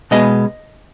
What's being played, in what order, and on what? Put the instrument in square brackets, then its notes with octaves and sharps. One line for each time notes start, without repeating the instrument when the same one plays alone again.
[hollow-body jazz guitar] B2 G#3 B3 D#5